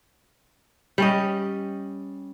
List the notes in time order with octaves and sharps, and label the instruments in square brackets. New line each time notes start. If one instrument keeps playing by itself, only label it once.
[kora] G3 C#4 D#5